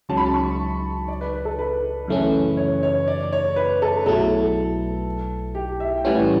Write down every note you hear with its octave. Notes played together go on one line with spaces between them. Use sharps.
C#2 C#3 F#3 A5
B5
A5
C#6
D5
B4
B4
A4
B4
F#2 C#3 E3 A3 C#4
C#5
C#5
D5
C#5
B4
A4
B1 B2 F#3 A3 E4 A4
G4
E5
G5
A2 E3 G3 C#4 F#5